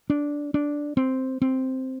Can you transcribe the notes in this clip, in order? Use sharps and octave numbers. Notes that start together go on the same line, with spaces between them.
D4
D4
C4
C4